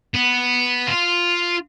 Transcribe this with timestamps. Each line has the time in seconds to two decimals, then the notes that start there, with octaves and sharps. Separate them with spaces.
0.15 B3
0.88 F4